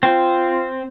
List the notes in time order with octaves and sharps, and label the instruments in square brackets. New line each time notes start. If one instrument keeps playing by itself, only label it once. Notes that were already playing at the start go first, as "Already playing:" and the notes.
[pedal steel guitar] C4 [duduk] F4